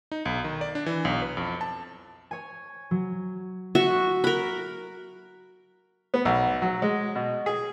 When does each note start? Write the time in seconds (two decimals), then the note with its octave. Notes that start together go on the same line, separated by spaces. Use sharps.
0.12 D#4
0.25 B1
0.44 D#3
0.61 D5
0.75 D4
0.86 E3
1.05 B1
1.22 B4
1.37 F2
1.61 A5
2.31 C#5 G#5
2.91 F#3
3.75 F#4 E5
4.24 A#4 B5 F#6
6.14 B3
6.25 B1
6.62 F#3
6.82 G#3
7.15 B2
7.46 G#4